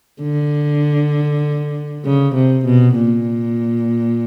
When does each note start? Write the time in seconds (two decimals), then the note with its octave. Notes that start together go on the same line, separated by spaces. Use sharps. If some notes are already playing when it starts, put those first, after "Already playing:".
0.22 D3
2.05 C#3
2.35 C3
2.66 B2
2.96 A#2